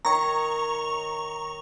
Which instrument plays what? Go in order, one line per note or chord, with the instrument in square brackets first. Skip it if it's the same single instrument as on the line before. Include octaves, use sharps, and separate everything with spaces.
[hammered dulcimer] D#3 C#5 [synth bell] A#5 C#6